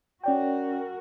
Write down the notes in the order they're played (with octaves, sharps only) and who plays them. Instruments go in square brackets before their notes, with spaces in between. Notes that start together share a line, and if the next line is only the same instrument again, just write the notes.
[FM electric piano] C#4 D5 G5 [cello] F#4 A#4